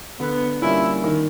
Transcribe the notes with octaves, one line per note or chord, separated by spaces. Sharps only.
D3 B3
G3 A#3 C#4 E4 F4
D#3